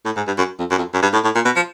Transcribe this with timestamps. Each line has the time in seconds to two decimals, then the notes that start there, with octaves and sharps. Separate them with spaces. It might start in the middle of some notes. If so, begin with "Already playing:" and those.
0.05 A2
0.16 G#2
0.27 G2
0.38 F#2
0.59 F2
0.70 F#2
0.78 F2
0.94 F#2
1.02 G2
1.13 A2
1.24 A2
1.35 A#2
1.45 B2
1.56 F3